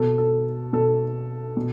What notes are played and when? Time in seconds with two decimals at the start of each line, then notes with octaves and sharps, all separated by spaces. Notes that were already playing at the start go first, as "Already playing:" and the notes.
Already playing: B2 A4
0.18 A4
0.73 B2 A4
1.57 B2